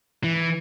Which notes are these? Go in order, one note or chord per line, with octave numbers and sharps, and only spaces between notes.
E3